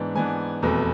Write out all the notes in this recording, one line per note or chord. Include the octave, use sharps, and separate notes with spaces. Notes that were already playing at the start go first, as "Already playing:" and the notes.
Already playing: G#2 E3 B3 D4
G#2 E3 B3 D4 G#5
F1 E2 B2 A3